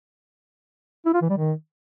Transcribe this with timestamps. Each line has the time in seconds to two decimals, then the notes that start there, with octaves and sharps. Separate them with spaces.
1.06 E4
1.14 F4
1.22 E3
1.29 G3
1.37 D#3